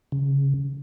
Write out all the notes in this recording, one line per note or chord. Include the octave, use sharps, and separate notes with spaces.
C#3